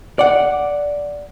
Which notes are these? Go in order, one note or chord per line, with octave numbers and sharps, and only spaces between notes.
D5 F#5